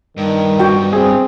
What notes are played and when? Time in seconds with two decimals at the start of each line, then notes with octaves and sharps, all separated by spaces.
0.17 G2 D#3
0.60 F#4 G5
0.93 C4 G#4